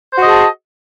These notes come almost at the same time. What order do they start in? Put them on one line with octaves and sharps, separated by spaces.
C5 F#4 D#5 G#4 A5